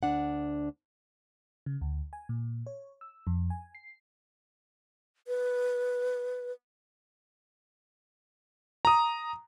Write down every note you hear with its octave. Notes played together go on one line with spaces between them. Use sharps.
D2 D4 F#5
C#3
D2
G#5
A#2
C#5
E6
F2
G#5
C7
B4
A#5 D#6